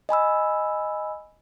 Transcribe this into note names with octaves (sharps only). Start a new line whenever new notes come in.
D#5 G#5 B5 E6